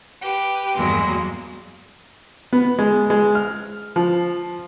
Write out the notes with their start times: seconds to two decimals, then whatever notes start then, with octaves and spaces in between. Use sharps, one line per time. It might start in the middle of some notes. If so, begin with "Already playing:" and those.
0.21 G4 B4
0.76 E2 G2 D#3 F#3 G#3 A#3
2.53 B3
2.79 G#3
3.10 G#3
3.35 F6
3.96 F3